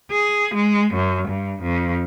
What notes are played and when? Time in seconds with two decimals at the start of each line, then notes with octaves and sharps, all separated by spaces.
0.11 G#4
0.55 G#3
0.94 F#2
1.28 G2
1.62 F2